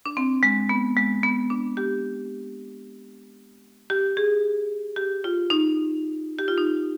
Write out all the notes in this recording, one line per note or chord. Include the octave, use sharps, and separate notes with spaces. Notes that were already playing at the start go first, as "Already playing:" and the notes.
D4
C4
G#3
B3
G#3
B3
D4
G4
G4
G#4
G4
F4
D#4
G4
F4
D#4